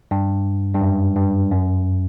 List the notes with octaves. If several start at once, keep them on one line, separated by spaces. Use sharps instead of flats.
G2
G2
F#2
G2
F#2